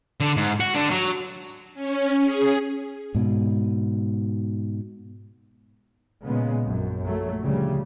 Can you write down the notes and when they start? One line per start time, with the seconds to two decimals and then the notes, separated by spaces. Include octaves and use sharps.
0.21 D3
0.37 G#2
0.60 F#4
0.75 D3
0.91 F#3
1.74 C#4
2.23 G#4
3.15 G#2 B2
6.24 A#2 C#3 G#3 B3
6.64 A#1 F#2
7.02 A#1 F#3 A3
7.42 D2 C#3 F3 G3